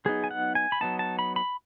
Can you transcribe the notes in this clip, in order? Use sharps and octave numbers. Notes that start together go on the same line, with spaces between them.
F#3 B3 D#4 G#4
G#5
F#5
G#5
B5
F#3 B3 D#4 A5
A5
B5
B5